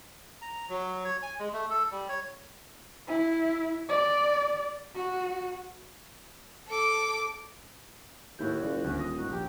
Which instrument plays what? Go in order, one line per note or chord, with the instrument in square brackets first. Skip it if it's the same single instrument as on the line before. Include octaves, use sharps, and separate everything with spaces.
[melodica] A#5
F#3
C#5
G#5
G#3
A3
A4
G3
C#5
[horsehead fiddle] E4
D5
F#4
[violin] A4 D6
[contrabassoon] D#2 [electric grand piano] A2 E4 G6 [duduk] F#4
[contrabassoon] F#1 [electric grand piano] F4 D5
[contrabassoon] D#1 [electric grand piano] D2
[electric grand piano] D#6 A#6
[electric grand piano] G#1 D#4 [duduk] F#4
[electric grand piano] A#1 [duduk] G4